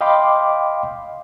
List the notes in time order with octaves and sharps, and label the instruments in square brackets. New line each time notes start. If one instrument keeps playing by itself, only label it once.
[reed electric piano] D#5 F5 G5 B5 C6 D6